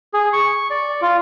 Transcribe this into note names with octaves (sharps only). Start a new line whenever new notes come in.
G#4
C#6
D5
F4